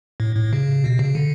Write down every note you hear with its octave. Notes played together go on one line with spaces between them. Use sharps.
A2
A2
C#3
B2
C#3
D3